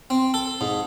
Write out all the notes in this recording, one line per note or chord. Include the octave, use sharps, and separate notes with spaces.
C4
A4
G#2